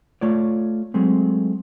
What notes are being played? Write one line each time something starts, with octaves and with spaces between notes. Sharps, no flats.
A3 F4 C#5 D5
F#3 G#3 A3 C4